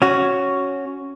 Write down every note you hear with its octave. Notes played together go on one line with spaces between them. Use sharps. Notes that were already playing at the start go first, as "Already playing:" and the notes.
C#4 F#4